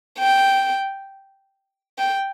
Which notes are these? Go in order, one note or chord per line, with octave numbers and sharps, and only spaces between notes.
G5
G5